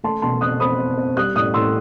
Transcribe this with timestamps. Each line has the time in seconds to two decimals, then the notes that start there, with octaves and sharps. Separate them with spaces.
0.04 A3 A5 C6
0.22 B2 A5 C6
0.41 C4 D#6 F#6
0.60 C4 B5 D#6
0.79 C4
0.97 C4
1.17 G3 D#6 F#6
1.36 A2 D#6 F#6
1.54 A2 C6 E6